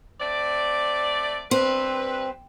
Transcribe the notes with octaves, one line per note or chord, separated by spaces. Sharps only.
A3 C4 D5
G2 C4 B4